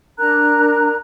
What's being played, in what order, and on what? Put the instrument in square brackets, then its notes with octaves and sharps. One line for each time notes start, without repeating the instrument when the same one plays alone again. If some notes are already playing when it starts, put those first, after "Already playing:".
[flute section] D4 A#4 A#5 F#6